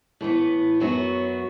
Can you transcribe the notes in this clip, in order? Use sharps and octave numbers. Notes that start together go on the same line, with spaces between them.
A2 E3 B3
F#2 F#3 B3 F#4